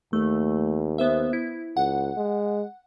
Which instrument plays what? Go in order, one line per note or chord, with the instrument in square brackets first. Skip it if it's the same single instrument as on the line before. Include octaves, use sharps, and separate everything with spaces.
[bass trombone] D#2 [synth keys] A3
[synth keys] B3 C5 E5
E4
[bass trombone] C#2 [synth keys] F#5
[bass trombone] G#3